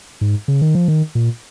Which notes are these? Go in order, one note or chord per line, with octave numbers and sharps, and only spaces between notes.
G#2
C#3
D#3
F3
D#3
A#2